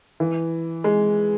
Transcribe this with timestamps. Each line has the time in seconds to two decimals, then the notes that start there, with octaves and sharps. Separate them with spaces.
0.20 E3
0.84 G#3